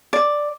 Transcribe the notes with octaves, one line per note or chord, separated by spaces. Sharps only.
D5